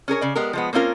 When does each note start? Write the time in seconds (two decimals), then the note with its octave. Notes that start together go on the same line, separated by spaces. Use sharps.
0.08 C#4 G#4 A#4 C#5
0.21 C#3 D5
0.35 G#3 B3 G4 A#4
0.53 F3 G#3 B3
0.73 A#3 C4 C#4 F4 A#4